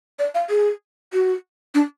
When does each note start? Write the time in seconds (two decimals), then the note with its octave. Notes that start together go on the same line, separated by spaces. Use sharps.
0.19 D5
0.35 F5
0.50 G#4
1.13 F#4
1.75 D4